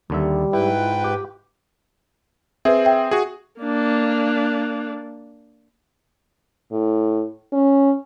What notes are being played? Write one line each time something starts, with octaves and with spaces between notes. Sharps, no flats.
D#2 D3 G3 E5
G#2 E4 B4 G5
F4
G4
C4 G#4 B4 E5
E5 G5
F#4 G#4
A#3 D4
A2
C#4